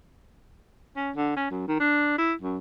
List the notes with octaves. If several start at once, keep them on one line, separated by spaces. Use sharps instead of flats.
C#4
D3
C#4
F#2
D#3
D4
E4
F#2